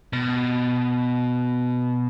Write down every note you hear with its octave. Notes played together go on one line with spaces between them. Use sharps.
B2